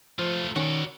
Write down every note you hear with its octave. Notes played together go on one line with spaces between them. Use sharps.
F3 A3 F4
D#3 C#4 F#4 D5